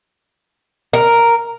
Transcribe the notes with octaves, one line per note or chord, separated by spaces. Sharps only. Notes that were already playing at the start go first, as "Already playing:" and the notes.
A#4